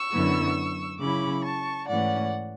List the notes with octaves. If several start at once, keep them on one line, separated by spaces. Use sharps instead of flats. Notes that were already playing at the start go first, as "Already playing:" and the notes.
Already playing: C#6 E6
F#2 D3 F#3 B3 E4
C#3 F#3 C#4 E4 B5 D6
A5 C#6
G#2 E3 A3 C#4 D5 F#5